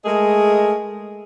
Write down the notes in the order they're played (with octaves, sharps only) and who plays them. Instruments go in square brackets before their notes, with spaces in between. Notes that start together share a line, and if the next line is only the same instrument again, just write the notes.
[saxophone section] G#3 A3 G#4 A#4 D#5